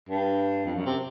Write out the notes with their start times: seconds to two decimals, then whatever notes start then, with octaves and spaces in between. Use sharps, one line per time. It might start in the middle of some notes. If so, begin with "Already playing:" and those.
0.09 G2
0.65 F2
0.75 F#2
0.86 C3